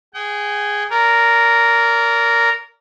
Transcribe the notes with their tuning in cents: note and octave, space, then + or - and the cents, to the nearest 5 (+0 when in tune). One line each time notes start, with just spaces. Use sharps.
G#4 -5 G5 -45
A#4 -5 D5 -35